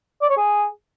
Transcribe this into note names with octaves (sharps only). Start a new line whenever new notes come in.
D5
C#5
G#4